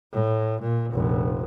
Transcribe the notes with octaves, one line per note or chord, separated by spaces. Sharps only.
A2
A#2
F1 A#1